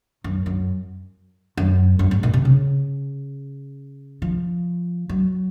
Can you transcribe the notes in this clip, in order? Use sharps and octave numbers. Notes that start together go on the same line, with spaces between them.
F#2
F#2
F#2
F#2
G#2
A#2
C3
C#3
F3
F#3